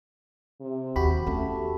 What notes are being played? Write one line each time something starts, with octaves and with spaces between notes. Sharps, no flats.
C3
D#2 F#4 G4 B5
E2 A3 C#4